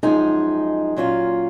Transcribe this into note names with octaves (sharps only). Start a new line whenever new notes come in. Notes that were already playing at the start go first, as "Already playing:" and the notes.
F#2 F3 G#3 D#4 G#4
A#2 F#3 C#4 F4